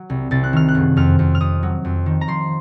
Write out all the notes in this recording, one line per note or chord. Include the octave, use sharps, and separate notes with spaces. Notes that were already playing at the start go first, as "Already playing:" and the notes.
Already playing: F#3
C2
C2 A6
F#6
D#3 F6
F#6
F#1
F2 F6
F2
F6
F2 D#6
F#3
F2
D#3
A#5
F3 C6